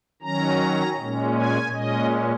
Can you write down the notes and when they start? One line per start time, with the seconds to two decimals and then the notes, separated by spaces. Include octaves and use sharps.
0.22 D#3 F#3 C#4 A#5
0.98 A#2 G#3 C#4
1.35 G#5
1.72 A#2 G#3 C#4 D#5